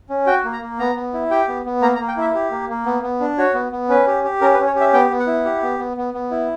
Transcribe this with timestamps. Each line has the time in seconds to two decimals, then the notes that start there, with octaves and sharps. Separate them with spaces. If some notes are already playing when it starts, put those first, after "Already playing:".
0.10 C#4
0.27 F#4 G5
0.44 A#3
0.53 A#5
0.62 A#3
0.79 B3 A#5
0.96 B3
1.14 E4
1.31 G4 G5
1.48 B3
1.66 B3
1.82 A#3 A#5
1.95 A#5
2.00 A#3
2.08 G5
2.17 E4 E5
2.35 G4
2.51 A#3
2.69 A#3
2.86 B3
3.03 B3
3.20 D4
3.38 F#4 C#5
3.54 B3
3.72 B3
3.89 C#4 B4
4.07 G4
4.24 G4
4.41 C#4 A#4
4.54 B4
4.59 C#4
4.67 C#5
4.76 G4
4.81 E5
4.93 B3 G5
5.10 B3
5.19 F#5
5.27 E4
5.45 G4
5.63 B3
5.79 B3
5.97 B3
6.14 B3
6.31 E4